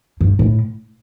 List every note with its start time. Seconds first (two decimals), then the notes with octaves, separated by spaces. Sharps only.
0.21 G2
0.39 A2